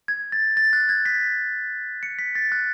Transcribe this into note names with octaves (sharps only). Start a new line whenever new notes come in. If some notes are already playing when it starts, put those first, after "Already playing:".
G#6
A6
A6
F#6
G#6
B6
C#7
B6
A6
F#6